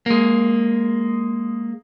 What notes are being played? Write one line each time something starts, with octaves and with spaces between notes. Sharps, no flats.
G#3 A#3